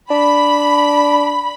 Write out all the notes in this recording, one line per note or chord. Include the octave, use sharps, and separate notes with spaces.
D4 B5